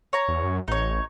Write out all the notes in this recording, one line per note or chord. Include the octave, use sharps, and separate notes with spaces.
C#5 A#5
E2
F#2
A1 D#4 C#5